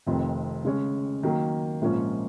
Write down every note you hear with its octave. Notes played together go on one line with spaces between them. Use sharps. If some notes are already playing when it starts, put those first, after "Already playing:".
F1 F2 D#3
C#3 G#3 C#4
D#3 F#3 A#3
A#1 G#2 F3 A#3 C#4